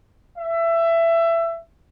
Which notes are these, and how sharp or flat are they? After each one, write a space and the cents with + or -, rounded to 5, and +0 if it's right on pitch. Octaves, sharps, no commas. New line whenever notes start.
E5 +20